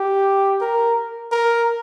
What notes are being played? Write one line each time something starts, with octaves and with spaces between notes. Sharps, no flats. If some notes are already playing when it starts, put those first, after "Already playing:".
Already playing: G4
A#4
A#4